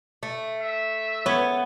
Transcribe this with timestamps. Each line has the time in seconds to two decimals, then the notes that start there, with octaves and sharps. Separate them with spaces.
0.23 A3
0.61 E5
1.26 B3 C#5